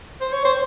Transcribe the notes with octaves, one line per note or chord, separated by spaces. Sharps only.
C5
C#5
C5